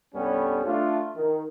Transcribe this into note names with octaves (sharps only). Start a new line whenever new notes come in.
C2 G2 G3 B3 C#4 A4
A3 D4 F4
D#3